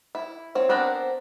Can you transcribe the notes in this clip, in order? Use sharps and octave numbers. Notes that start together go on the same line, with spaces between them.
E4
C4 C#5
B3 C4 D4 A#4